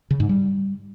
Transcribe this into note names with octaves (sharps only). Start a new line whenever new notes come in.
C#3
G#2
G3